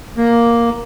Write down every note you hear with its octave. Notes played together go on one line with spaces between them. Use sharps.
A#3